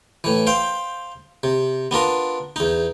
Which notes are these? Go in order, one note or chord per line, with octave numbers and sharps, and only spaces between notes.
A2 E3
C5 F5 G5
C3
B3 D4 F4 A#4
E2 D#4